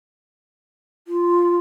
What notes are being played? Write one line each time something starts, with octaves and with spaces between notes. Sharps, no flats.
F4